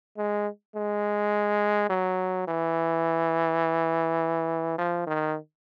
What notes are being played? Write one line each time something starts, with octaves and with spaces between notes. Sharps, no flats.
G#3
G#3
F#3
E3
F3
D#3